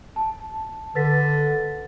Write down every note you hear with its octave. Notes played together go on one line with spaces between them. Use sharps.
A5
D3 B4 A6 B6